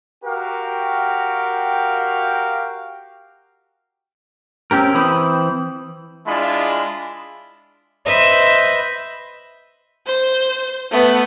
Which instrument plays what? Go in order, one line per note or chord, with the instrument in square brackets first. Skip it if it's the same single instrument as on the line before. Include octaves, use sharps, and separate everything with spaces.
[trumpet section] F#4 G4 A#4 F5 G5
[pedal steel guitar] C4 C#4 G4 A#4
E3 C4 C5 B5 D#6
[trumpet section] G#3 D4 E4 F4 B5
[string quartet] B4 C5 D#5 E5
[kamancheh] C5
A3 B3